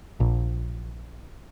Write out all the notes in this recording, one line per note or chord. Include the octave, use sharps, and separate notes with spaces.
A#1